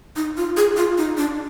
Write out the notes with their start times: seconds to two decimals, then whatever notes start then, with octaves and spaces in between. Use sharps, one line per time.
0.16 D#4
0.37 F4
0.57 G#4
0.77 F4
0.98 D#4
1.17 D4